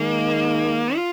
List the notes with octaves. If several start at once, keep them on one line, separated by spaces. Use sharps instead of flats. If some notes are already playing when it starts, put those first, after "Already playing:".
Already playing: D#3 G#3 A#3 D#4
F4